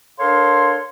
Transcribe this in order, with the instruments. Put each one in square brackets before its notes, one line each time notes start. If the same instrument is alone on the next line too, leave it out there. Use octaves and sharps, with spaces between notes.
[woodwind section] D4 A4 A#4 C#5 F5 C6